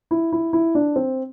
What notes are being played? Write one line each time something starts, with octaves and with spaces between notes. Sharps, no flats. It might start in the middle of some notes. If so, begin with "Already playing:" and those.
E4
E4
E4
D4
C4